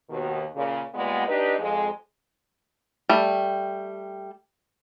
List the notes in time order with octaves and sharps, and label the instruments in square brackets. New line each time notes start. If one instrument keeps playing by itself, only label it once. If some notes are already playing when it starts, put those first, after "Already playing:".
[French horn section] D#2 B2 D#3
A#2 C#3
A#2 G3 G#3 B3
D4 D#4 G4 B4 D#5
F2 G#3
[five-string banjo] G3 A3